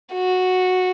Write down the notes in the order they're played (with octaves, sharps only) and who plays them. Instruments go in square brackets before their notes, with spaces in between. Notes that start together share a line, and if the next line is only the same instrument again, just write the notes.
[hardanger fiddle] F#4